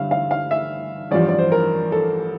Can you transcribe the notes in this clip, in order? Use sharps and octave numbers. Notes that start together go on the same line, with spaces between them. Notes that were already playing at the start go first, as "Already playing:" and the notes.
Already playing: G1 G2 D3 G3 E5 F5
F5
F5
E5
A1 G2 F3 D5
D5
C5
A#4
A4